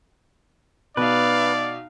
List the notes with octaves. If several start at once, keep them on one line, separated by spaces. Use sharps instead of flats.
B2 D#4 B4 D5 F5